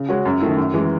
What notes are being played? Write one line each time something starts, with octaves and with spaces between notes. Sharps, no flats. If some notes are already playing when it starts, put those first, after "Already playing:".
Already playing: C#3
G#3 C#4 F#4
F#2
D#3 A3 E4
F#2
E3 G#3